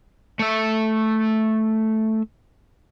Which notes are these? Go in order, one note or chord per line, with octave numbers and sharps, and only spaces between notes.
A3 E5